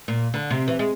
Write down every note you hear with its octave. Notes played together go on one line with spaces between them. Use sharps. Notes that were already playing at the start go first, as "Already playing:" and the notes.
A#2
D3
C3
E3
G#3